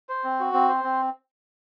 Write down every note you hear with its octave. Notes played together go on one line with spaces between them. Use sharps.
C5
C4
F#4
C4
C5
C4